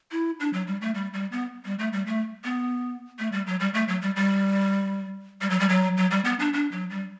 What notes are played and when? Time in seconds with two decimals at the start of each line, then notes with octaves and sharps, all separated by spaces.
0.11 E4
0.40 D4
0.53 F#3
0.67 G3
0.81 A3
0.95 G3
1.14 G3
1.32 B3
1.65 G3
1.79 A3
1.93 G3
2.07 A3
2.44 B3
3.19 A3
3.32 G3
3.47 F#3
3.60 G3
3.74 A3
3.88 F#3
4.02 G3
4.16 G3
5.41 G3
5.50 F#3
5.60 G3
5.69 F#3
5.97 F#3
6.11 G3
6.25 B3
6.40 D4
6.53 D4
6.72 F#3
6.90 G3